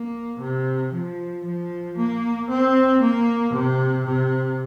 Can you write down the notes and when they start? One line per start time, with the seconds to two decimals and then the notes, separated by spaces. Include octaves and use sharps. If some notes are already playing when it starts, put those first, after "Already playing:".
Already playing: A#3
0.40 C3
0.92 F3
1.44 F3
1.97 A#3
2.49 C4
3.01 A#3
3.53 C3
4.06 C3